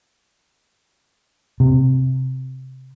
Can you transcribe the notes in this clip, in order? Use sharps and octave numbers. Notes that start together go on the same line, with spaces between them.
C3